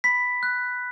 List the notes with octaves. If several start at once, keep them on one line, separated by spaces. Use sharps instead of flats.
B5 B6
F#6